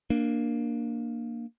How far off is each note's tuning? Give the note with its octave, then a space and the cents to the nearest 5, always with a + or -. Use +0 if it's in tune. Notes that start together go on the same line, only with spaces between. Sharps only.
A#3 +0 D4 +5